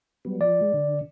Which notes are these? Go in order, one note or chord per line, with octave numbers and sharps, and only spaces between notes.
F#3 G3 B3
F3 D5
G#3
D3